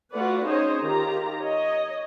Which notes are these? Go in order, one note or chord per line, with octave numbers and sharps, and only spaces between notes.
A3 F4 F#4 B4 D5 F#5
C#4 D#4 G#4 C5 C#5 D#5
D#3 F4 G4 A#5
C#5 D#5